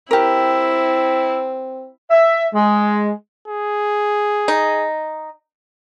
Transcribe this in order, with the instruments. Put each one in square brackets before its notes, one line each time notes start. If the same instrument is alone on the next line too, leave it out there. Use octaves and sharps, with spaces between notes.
[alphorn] C4 [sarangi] E4 [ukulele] G4 A#4
[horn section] E5
G#3
[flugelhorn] G#4
[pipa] D#4